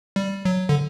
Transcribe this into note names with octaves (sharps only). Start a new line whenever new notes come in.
G3
F#3
D3